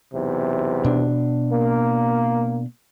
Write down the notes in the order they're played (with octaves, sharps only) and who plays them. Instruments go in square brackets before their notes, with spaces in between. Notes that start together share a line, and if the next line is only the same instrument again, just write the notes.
[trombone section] B1 E2 C3
[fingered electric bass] B2 D4
[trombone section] A#3